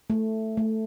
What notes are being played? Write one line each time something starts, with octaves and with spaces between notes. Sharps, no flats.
A3
A3